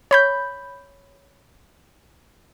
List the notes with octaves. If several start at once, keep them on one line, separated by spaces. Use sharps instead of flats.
C#5 B5 G6